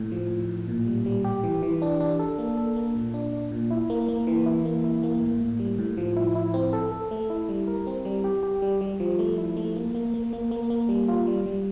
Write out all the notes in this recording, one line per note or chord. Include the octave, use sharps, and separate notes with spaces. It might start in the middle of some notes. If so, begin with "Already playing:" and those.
Already playing: A2
F3
A2
A2
A#2
G3
G3
G4
E3
E3
D4
D4
A4
A#3
A4
A#3
A#2
D4
D4
A#2
E4
A#3
A#3
E3
E4
A#3
E4
A#3
A2
A2
G3
A2
F3
E4
E4
C4
A4
A4
A3
E4
G3
A#4
C4
G3
G4
G4
G3
G3
F3
A3
E4
A3
A#3
A#3
A#3
A#3
A#3
A#3
G3
F4
G3
G3